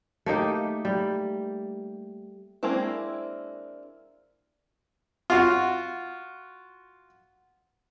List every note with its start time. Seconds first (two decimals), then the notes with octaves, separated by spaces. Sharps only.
0.26 A3 A#3 D#4 G4
0.85 G3
2.63 G#3 A#3 C4 D4 E4
5.30 F4 F#4